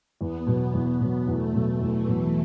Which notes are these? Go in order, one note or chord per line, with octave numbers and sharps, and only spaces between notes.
E2 B3
B2 F#3
E2 B3
B2 F#3
E2 A3
B2 F#3
E2 E3
B2 F#3